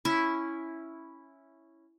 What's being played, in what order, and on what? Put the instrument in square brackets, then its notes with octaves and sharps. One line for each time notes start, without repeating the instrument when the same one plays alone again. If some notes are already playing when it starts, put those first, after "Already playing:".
[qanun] C#4 E4 E5